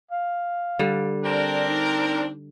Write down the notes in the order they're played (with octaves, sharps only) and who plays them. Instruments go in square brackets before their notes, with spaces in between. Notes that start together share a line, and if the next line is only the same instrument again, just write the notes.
[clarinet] F5
[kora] D3 G3
[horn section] C4 D4 A#4 [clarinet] D5
[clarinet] D#4